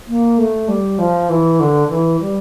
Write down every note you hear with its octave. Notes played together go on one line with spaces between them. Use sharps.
A#3
A3
G3
F3
E3
D3
E3
G3